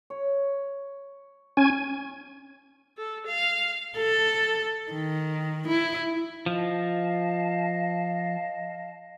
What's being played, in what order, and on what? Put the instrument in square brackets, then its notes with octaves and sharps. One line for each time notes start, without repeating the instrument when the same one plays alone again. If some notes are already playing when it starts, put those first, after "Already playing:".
[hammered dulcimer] C#5
[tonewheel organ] C#4 G#5
[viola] A4
F5
[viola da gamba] A4
D#3
E4
[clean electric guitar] F3 [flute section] D#5 F5 A5